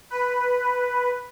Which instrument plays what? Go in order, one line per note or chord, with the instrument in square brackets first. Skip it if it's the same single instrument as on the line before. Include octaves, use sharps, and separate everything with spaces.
[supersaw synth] B4